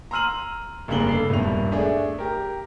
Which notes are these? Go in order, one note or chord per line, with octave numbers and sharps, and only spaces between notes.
A#5 C6 E6 F6 D#7 F#7
F1 G2 C#3 A#3 F#7 G7
A4 C7
D#1 G2 B2 E4 F7
A3 D4 G#4
G4 A#4